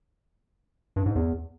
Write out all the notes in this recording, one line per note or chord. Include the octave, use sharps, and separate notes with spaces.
G2
G#2
E2